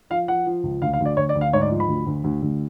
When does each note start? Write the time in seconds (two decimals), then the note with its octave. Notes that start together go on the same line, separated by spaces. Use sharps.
0.10 F3 F5
0.28 F3 F#5
0.46 F3
0.63 C#2
0.82 D2 F5
0.93 F5
1.00 D2
1.06 D5
1.17 D2 C#5
1.29 D5
1.35 D2
1.41 F5
1.53 G#2 C#5
1.62 D5
1.71 F3
1.80 B5
1.88 D2
2.07 D2
2.24 D2
2.42 D2